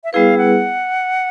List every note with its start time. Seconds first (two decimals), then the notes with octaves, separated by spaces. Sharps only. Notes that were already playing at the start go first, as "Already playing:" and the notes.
0.04 E5
0.13 G3 B3 E4 G#4 B4 F5
0.38 F#5